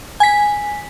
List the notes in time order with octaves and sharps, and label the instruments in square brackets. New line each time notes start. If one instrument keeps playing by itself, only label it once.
[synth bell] G#5 B6